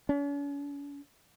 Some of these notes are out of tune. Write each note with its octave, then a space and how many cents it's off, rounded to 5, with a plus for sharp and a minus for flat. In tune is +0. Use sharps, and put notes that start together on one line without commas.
C#4 +45